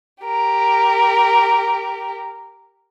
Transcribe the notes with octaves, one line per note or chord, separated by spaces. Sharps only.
G4 A#4